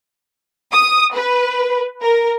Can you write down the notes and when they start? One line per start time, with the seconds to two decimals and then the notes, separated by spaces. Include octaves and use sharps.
0.73 D#6
1.15 B4
2.02 A#4